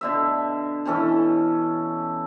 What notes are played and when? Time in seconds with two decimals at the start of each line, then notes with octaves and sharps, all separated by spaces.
0.01 B2 D3 E5
0.85 B2 E3 C#4 A4